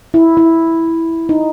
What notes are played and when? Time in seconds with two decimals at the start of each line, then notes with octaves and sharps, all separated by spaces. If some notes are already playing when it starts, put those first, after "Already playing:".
0.14 E4
0.37 E4
1.29 D#4